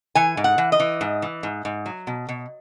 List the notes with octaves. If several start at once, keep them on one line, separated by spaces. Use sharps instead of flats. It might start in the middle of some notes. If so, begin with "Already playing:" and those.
E3 G#5
G#2
F#5
E3
D#5
E3
G#2
E3
G#2
G#2
F#3
B2
B2